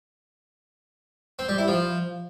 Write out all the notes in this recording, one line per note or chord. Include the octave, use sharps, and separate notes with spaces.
C4
G3
E4
F3